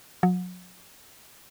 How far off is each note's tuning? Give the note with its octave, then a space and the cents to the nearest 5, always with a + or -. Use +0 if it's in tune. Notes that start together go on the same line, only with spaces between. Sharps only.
F#3 -35